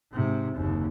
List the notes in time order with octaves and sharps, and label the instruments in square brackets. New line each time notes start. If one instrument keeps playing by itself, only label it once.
[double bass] G#2 C3
F#1 D#2